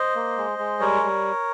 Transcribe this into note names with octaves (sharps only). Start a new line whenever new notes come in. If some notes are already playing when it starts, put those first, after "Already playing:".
Already playing: C5 D#5
A#3
G#3
G#3
G3 A#4 C#5
G3